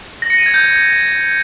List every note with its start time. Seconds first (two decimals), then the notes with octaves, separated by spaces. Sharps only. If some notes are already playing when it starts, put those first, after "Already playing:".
0.22 A#6
0.30 C#7
0.38 D#7
0.46 G#6
0.54 G6